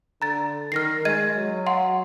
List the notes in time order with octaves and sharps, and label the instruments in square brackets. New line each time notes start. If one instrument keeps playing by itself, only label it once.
[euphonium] D3 [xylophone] A#5 A6
[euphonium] D#3 [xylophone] F6 A#6 C7
[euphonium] G#3 [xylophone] D#5 G#6 D#7
[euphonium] F#3
[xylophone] F5 F#5 C6